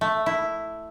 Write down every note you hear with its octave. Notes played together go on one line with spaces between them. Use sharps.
A3
E4